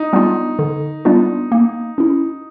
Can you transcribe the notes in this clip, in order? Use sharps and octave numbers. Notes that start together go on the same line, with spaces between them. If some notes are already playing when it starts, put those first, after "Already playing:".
Already playing: D#4
G3 B3 D4 F4
D3
G3 B3 D4 F4
A#3
C#4 E4